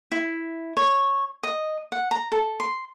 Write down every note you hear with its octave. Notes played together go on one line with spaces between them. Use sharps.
E4
C#5
D#5
F#5
A#5
A4
C6